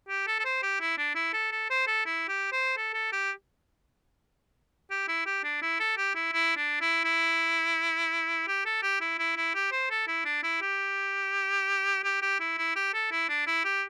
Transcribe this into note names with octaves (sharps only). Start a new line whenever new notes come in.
G4
A4
A4
C5
G4
E4
D4
E4
A4
A4
C5
A4
E4
G4
C5
A4
A4
G4
G4
E4
G4
D4
E4
A4
G4
E4
E4
D4
E4
E4
G4
A4
G4
E4
E4
E4
G4
C5
A4
E4
D4
E4
G4
G4
G4
E4
E4
G4
A4
E4
D4
E4
G4